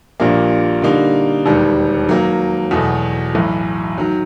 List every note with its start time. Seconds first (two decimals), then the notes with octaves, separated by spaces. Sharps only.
0.20 A#1 A#2 G3 A#3 D4
0.82 D3 G3 A#3 D#4
1.46 E1 D#2 D#3 G3
2.08 D#3 F#3 A#3
2.71 E2 B2 F#3 A3
3.35 B1 A2 E3
3.98 D#3 F#3